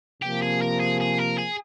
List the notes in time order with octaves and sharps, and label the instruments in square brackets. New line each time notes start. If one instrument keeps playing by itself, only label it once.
[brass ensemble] C3 F3 A#3 [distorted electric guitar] G4
[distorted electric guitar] G#4
A#4
G#4
G#4
A#4
G#4